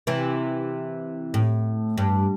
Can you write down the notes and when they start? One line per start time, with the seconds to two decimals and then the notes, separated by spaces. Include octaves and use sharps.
0.07 C3 E3
1.34 A2
1.98 G2